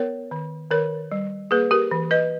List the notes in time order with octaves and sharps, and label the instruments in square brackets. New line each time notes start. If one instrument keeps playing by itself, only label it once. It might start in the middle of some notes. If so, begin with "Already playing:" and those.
Already playing: [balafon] B3 A#4 C#5
D#3
D#3 A#4 C#5
G3
A#3 G#4 B4
G4 A#4
E3
B4 D#5